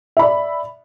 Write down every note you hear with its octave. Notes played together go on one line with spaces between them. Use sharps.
D5 E5 B5